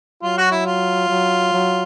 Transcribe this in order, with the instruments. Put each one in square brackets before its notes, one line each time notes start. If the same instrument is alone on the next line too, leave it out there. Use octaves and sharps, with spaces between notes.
[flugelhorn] F#3 [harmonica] F4
[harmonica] F#4
E4
F4
[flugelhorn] F#3
F#3